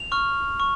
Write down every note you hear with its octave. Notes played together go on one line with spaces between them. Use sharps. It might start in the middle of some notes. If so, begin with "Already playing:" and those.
Already playing: F7
C#6 F6
C#6